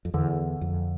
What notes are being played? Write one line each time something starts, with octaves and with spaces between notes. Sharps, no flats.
F2
E2 D3
F2